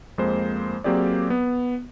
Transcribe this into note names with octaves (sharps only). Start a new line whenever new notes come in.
F2 G#3 A#3 C5
F#3 A#3 C4 G4 G#4 D5
B3